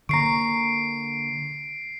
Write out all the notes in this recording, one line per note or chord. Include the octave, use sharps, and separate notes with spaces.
D3 A#3 A#5 C#6 C7 D7